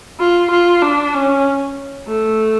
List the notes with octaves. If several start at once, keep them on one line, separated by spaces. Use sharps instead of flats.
F4
F4
D4
C#4
A3